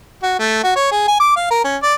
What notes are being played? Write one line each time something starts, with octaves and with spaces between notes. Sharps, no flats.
F#4
A3
F#4
C#5
G#4
G#5
D6
F5
A#4
C#4
D5